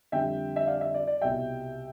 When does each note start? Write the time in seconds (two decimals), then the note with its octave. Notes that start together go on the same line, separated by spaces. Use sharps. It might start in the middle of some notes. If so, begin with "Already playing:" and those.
0.12 F2 D3 G3 E5 G5
0.56 E5
0.67 D5 F5
0.81 E5
0.94 D5
1.07 D5
1.21 C2 B2 G3 E5 G5